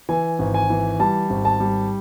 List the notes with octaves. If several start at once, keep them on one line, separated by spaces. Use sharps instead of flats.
E3 G#5
G#1
G#5
E3
G3 A5
G#1
A5
G3